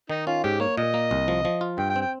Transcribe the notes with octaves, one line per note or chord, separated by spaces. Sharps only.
D#3 D#4
C#4 F4
G#2 G4
A#3 C#5
A#2 D#5
A#3
C2
F3
F3
F4
G2 G5
G5
C4
G5